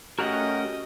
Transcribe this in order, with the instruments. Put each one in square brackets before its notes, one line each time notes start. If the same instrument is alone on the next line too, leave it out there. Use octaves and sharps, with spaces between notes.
[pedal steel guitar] A3 C#4 A#4 [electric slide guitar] F#4 G4 F#5 [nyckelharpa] D#5